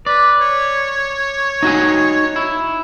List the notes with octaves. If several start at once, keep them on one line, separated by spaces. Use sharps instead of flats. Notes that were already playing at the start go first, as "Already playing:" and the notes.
B4 D5
C#5
D#4 F#4 G#5
E4